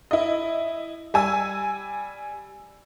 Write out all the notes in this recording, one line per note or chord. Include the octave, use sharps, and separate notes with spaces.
E4 D#5
G3 G#5 E6